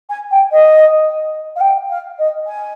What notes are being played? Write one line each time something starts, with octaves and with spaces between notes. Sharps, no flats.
G#5
G5
D#5
F5
G5
F5
D#5
G#5